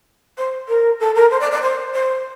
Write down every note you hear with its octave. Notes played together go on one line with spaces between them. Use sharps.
C5
A#4
A4
A#4
C5
D5
D5
C5
C5